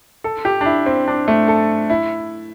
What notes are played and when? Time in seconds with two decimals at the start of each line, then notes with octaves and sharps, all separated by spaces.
0.24 A4
0.45 G4
0.61 D4
0.66 E4
0.86 C4
1.08 D4
1.28 A3
1.48 A4
1.90 E4